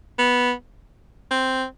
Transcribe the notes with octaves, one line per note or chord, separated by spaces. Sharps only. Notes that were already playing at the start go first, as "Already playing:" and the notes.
B3
C4